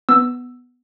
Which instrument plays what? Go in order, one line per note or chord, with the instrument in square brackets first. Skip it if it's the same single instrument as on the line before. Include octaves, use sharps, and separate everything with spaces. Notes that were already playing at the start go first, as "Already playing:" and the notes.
[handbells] B3 E6